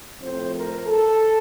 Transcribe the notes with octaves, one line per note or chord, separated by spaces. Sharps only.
A2 F3 A3 C4 C5
A#4
A4